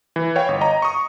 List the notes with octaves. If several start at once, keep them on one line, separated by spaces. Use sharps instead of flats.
E3
C#5 F5 G5
G1
D#5 A#5
C#6 D#6